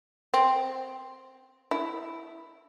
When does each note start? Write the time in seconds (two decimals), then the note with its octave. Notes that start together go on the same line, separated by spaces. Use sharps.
0.34 C4
1.71 E4